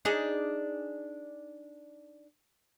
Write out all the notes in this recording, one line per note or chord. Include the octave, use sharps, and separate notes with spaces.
D4 D#4 G#4